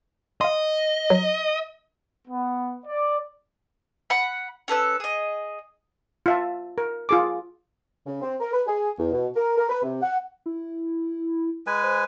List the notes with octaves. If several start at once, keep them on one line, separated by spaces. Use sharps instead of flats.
D#5 F5 C6
F#3
B3
D5
F#5 B5
C#4 A4 B4 E6
G#4 D#5
F4 E5 A5
A#4
F4 G#4 D6
C#3
C4
A#4
B4
G#4
E2
B2
A#4
A#4
B4
C3
F#5
E4
G#3 B4 G#5
C5